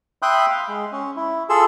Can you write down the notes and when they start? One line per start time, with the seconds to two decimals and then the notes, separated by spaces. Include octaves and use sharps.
0.22 E5 G5 B5 C6 D#6 F#6
0.50 F5
0.68 G#3
0.92 C#4
1.16 E4
1.49 F4 G#4 A4 E6